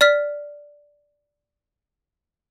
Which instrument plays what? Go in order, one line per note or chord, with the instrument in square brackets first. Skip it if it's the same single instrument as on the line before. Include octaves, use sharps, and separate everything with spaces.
[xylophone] D5 F6 B6